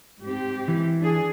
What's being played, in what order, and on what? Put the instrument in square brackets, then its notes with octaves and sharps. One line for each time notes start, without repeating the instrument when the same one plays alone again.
[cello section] G#2 C4 G4
[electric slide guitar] E3
[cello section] D4 G#4